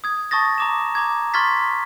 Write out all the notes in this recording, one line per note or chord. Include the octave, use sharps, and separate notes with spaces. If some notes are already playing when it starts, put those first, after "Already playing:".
D#6 G#6
A5 C#6 D#6 A6 A#6
A#5 D6 E7
A#5 D6 G#6
C6 C#6 F6 G#6 A6 B6